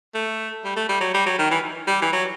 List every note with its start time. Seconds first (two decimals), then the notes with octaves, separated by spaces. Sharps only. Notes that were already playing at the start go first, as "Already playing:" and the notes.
0.15 A3
0.65 G3
0.76 A3
0.89 G3
1.01 F#3
1.14 G3
1.26 F#3
1.39 D#3
1.51 E3
1.88 G3
2.02 E3
2.13 F#3